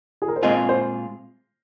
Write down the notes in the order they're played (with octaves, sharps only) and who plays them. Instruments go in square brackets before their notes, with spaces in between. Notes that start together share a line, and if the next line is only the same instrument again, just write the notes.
[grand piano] G#4
A#4
C5
[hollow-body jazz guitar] A#2 G#3 C4 F4 G#4 [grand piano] D#5
[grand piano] C5